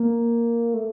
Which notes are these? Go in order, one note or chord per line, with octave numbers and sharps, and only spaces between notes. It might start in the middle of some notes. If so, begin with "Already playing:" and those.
Already playing: A#3
A3